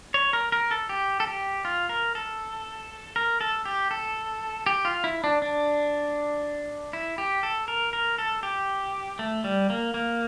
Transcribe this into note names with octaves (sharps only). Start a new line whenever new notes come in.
C#5
A#4
A#4
A4
G4
A4
G4
F4
A#4
A4
A#4
A4
G4
A4
G4
F4
E4
D4
D4
E4
G4
A4
A#4
A#4
A4
G4
A3
G3
A#3
A#3